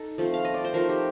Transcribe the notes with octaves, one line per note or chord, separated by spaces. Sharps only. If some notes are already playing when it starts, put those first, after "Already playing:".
Already playing: D#4 A4
F3 A3 C4
F5
D#5
D5
C5
F3 A3 D#4 A#4
G4